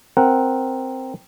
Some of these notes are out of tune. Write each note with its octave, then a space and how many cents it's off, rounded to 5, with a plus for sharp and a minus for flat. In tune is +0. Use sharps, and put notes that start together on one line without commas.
C4 +0 A#4 +0 F#5 +0